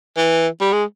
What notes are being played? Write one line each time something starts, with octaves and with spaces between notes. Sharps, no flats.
E3
G3
G#3